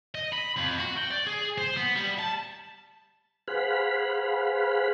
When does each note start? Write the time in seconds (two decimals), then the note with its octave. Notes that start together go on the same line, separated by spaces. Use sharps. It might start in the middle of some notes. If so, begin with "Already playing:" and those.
0.15 D#5
0.33 B5
0.57 F2
0.79 F#4
0.97 G5
1.11 D5
1.27 G#4
1.58 C5
1.77 B3
1.96 G3
2.19 A5
3.48 G#4 B4 C5 F5 F#5 B5